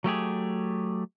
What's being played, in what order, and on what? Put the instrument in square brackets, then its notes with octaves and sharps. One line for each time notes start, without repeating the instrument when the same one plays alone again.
[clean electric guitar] F#3 A3 G4 G#4